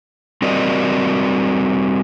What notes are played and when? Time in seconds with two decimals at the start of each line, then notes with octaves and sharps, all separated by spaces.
0.42 G3 C4 F#4 A#4 D5 D#5